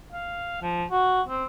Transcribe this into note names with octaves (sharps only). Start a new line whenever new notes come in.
F5
F3
F#4
C4